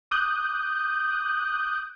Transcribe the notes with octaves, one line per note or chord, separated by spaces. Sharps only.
D6 D#6 F#6 G6